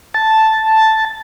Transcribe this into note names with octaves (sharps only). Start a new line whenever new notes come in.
A5